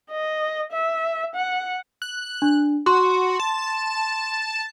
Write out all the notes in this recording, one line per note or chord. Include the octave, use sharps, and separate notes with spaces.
D#5
E5
F#5
F#6
D4
F#4 C6
A5